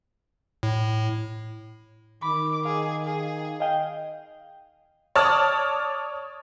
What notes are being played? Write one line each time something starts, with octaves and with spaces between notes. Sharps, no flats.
A2
D#3 B5 D6
G#4 F5
G#4
D#5 F5 G5
C#5 D5 A5 D#6 F6